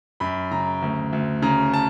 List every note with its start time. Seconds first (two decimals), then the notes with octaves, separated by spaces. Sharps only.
0.20 F#2 B5
0.51 C#3 A#5
0.82 D2
1.13 D2
1.42 C#3 A#5
1.74 A5